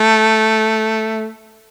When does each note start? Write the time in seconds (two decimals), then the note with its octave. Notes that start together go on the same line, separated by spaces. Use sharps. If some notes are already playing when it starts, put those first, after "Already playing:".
Already playing: A3